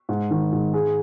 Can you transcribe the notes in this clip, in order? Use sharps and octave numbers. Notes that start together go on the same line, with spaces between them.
G#2
D#3
G#2
G#3